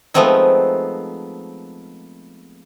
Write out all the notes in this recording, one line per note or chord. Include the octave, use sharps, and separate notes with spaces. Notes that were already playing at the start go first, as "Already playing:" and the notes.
F3 G#3 A3 B3 C4 D#4